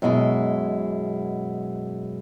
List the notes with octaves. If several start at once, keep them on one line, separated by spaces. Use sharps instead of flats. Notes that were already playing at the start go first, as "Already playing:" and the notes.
F#2 B2 G#3 E4